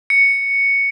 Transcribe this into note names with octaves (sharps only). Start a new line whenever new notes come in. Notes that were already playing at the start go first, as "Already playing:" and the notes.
C#7